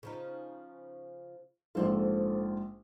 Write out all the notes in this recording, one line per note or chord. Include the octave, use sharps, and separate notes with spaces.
C#3 F3 D#4
A#1 G#2 F4 A4 C5 D5